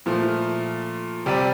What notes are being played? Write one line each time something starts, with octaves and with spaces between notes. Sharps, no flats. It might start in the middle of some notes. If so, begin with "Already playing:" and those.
A#2 F3 A3
C3 G3 C4 G4 D5